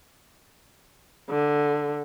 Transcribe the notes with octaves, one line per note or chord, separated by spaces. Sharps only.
D3